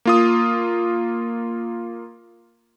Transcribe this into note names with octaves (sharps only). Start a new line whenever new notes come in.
A#3 F4 D#6